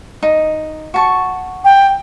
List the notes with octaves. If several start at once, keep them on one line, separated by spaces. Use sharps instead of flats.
D#4
F#4 A5 C#6
G5